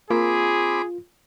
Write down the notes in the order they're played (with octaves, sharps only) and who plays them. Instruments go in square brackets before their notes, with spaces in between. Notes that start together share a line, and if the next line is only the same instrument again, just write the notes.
[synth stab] A#3 [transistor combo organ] C4 B5 D6 [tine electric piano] F4 [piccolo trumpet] G#4